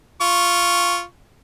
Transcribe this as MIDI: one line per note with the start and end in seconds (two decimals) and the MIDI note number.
0.21 1.03 65
0.21 1.03 85